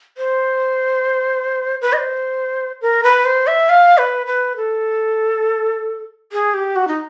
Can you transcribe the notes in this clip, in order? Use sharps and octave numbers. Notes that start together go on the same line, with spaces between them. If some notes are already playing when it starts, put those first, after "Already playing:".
C5
B4
D#5
C5
A#4
B4
C5
E5
F5
B4
B4
A4
G#4
G4
F#4
D#4